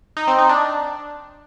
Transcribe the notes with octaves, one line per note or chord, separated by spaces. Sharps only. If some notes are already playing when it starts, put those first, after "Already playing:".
D#4
C4
D#4
D4